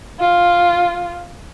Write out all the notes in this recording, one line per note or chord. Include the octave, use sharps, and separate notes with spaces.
F4